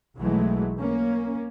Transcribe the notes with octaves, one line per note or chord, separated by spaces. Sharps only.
B1 E3 F#3 G#3 A3
A#3 C#4